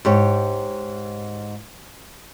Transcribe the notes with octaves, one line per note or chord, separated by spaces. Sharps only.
G#2 G4 C#5